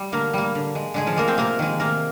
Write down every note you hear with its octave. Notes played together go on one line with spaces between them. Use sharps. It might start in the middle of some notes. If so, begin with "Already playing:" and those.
Already playing: G3
D3 A#3 A#4
G3 A#3
D3
G#3
D3 G#3 G#4
F3 F4
G#3 A#3 A#4
C4 C5
C3 A#3 A#4
D#3 G#3
C3 A#3 A#4